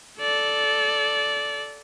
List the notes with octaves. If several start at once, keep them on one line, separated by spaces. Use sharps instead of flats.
A4 D5